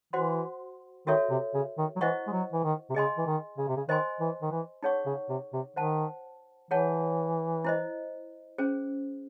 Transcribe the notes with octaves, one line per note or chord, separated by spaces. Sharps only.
E3 F#4 C5 F#5 C6
D#3 F#4 A4 C#5 E5
C3
C#3
D#3
F#3
E3 E4 C5 D#5 F#5 C#6
G#3
F#3
E3
D#3
C3
C#3 G#4 D#5 G#5 C6
E3
D#3
C#3
C3
C#3
D#3 C5 D#5 G#5 C6
E3
D#3
E3
D#4 G#4 C#5 F#5 C#6
C#3
C3
C3
D#3 C5 F#5 A5
E3 G#4 C#5 F#5 A5
E4 C5 D#5
C#4 G#4 C5